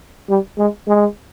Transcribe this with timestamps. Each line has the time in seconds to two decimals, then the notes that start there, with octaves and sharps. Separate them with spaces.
0.30 G3
0.58 G#3
0.88 G#3